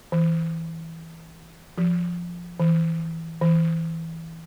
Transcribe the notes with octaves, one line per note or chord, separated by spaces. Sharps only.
E3
F3
E3
E3